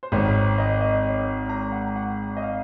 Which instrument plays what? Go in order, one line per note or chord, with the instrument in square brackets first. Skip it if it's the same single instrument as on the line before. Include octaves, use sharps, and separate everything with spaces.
[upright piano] C5
[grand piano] G#1 G#2 D#3 [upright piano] C#5
[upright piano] C#5
D#5
D#5
C#5
A#5
F#5
F#5
D#5
F5